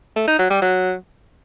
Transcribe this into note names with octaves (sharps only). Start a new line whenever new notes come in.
A3
D#4
F#3
G3
F#3